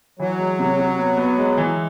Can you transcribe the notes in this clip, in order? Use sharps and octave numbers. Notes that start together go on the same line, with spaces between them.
E3 F#3
G#3
C3
C3
B3
B3
G#3
E3